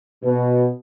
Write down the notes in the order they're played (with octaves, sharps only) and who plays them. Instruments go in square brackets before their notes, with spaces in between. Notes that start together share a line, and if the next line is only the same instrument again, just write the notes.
[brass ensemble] B2